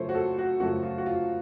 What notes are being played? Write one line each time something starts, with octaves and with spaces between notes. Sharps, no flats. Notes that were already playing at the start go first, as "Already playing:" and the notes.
Already playing: F#2 C#3 F3 A3 C5 C#5
F#4
A4
F#4
F#2 C#3 F3 A3 F#4
F4
F#4
F4